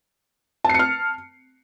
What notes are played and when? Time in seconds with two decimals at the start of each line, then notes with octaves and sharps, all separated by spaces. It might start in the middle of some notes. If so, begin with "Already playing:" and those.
0.64 A5
0.69 C7
0.74 C#7
0.79 F6